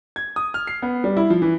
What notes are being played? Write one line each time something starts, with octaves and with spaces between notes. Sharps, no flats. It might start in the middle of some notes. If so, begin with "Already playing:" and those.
G#6
D#6
F6
C7
B3
G3
E4
F3
E3